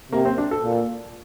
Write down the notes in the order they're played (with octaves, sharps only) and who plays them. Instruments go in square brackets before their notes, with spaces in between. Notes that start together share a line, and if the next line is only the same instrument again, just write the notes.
[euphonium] C3 [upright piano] A#3
[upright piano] C4
D4
A4
[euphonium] A#2